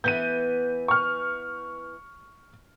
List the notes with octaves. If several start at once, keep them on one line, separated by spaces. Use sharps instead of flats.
E3 B3 G6 D#7
C#6 F6